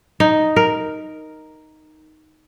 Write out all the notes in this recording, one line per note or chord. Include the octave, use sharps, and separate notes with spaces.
D#4
A#4